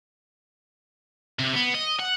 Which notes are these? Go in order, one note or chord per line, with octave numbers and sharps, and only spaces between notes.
C3
B3
D#5
F#5